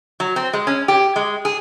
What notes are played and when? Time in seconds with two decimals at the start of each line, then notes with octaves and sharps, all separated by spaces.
0.20 F#3
0.36 C4
0.53 G#3
0.67 C#4
0.88 G4
1.16 G#3
1.45 G#4